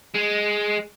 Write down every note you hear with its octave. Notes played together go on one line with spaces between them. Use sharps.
G#3